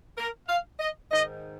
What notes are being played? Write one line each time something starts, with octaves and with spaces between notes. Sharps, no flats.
A#4
F5
D#5
G#2 D#3 D#5